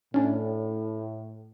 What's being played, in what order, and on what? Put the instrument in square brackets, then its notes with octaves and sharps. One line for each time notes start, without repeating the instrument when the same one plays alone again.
[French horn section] A2 [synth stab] C#4 D4